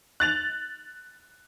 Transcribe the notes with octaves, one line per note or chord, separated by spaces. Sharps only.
F#6 A6 F7